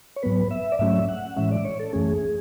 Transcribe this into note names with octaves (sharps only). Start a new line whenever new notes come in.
C#5
G#2 F#3 B3 B4
E5
D5
G#2 F#3 A3 C#4 E5
F#5
A2 E3 G#3 C#4 E5
D5
C#5
A4
F#2 E3 A3 C#4 G#4